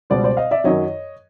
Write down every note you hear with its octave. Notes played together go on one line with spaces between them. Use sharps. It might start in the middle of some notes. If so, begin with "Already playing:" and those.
C#2 B2 G3 C5 D5
C5 D5
D#5 F5
D5 E5
F#2 D#3 F#3 C#5 D#5